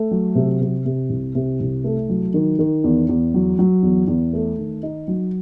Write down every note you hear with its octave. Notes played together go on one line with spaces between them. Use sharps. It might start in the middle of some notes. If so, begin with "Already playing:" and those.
Already playing: A3
F#3
C3
C3
C3
C2
C3
C2
A3
F#3
D#3
D#3
E2
E2
F#3
F#3
E2
E2
A3
D#3
D#4
F#3